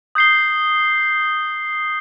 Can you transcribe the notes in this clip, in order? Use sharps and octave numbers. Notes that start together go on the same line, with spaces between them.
D#6 G6 C7 G7